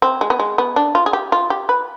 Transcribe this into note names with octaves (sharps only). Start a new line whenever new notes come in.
C4
G#3
B3
G#3
B3
D4
F4
G#4
G4
F4
G4
B4